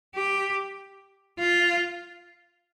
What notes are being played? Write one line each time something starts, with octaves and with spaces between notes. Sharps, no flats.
G4
F4